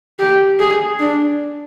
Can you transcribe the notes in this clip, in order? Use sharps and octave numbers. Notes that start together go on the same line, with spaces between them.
G4
G#4
D4